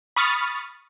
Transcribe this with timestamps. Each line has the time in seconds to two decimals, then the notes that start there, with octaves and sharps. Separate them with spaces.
0.16 B5 C#6 D#6 F6 A6